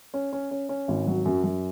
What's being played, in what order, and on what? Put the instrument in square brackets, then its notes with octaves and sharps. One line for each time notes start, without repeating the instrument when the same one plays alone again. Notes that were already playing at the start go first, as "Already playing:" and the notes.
[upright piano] C#4
C#4
C#4
C#4
G#1
F#3
F#2
F#2